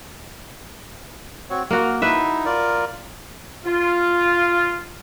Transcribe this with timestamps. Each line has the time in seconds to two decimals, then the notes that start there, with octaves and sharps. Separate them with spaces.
1.50 C4 F#4 C#5
1.70 A#3 F#4 F6
2.02 D#4 E4 B4 E5
2.46 F4 A#4 D5
3.66 F4